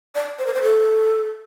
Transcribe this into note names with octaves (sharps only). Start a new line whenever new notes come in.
D5
C5
A#4
C5
A4